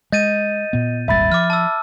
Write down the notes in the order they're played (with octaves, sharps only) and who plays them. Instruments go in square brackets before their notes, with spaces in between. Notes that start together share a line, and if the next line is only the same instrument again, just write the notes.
[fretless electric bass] G#3 [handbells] D#5 [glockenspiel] G6 A6 D#7
[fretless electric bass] A#2 B3
[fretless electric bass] D#1 G#1 G3 [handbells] E5 B5 A6
[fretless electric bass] F3 [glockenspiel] D6 F6
[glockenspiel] A5 E6